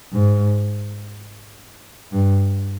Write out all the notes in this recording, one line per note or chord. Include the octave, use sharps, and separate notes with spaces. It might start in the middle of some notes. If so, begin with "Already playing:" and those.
G#2
G2